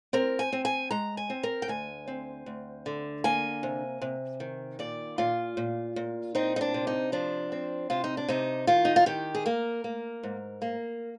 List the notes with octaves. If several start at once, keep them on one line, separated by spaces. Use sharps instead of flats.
C4 A#4
G#5
C4
G#5
G#3 A#5
G#5
C4
A#4
G5
D2 G#5
C4
D2
D3
A#3 G#5
C3
C3
D#3
A#2 D5
A#2 F4
A#2
A#2
C4 D#4
D#4
D4
C3
D#4
F3 D4
C4
C3 F4
D#4
D4
C3 D#4
D#3 F4
D#4
F4
D#3 G4
G#4
A#3 A#4
A#3
G#2
A#3